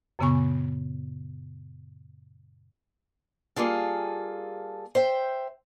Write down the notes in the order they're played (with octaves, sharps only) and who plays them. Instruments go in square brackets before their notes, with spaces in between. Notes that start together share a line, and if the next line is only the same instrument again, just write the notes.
[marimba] F#2 A#2 C#3 B3 G#5 C#6
[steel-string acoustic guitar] G3 A#3 F4 G#4 A4
C5 E5 G5